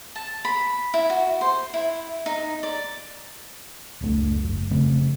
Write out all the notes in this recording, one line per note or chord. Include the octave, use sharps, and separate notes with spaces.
A5
B5
E4
F#4
C5
E4
D#4
D5
F#1 C#2 A3 D4
F#1
F1 C#3 A3 C4